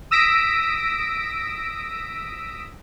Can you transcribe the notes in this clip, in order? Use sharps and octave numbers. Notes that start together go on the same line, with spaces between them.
D#6 E6 A#6 B6 D7